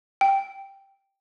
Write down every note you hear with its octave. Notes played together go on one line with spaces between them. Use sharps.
G5